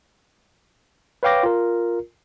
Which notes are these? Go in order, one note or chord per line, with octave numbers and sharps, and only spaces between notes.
B4 C#5 F5 G5 D6 A#6
F4 A#4